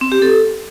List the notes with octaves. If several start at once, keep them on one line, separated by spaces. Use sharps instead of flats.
C4
G4
A4